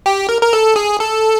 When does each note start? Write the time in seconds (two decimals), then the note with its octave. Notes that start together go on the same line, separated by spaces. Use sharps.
0.06 G4
0.29 A#4
0.42 A#4
0.53 A4
0.76 G#4
1.00 A4